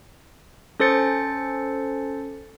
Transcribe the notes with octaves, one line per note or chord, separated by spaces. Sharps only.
C#4 A4 C5 A6 C#7